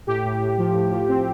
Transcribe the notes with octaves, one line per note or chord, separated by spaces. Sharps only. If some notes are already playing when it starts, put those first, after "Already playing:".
A2 G4
A2
A2
F3
A2
F3
C4